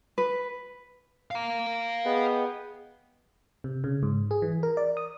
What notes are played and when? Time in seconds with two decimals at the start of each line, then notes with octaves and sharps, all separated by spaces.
0.18 B4
1.31 F5 A#5
2.06 B3 G#4 D#5 G5
3.64 C3
3.84 C#3
4.03 G#2
4.31 G#4
4.42 E3
4.63 A#4
4.77 D5
4.97 D#6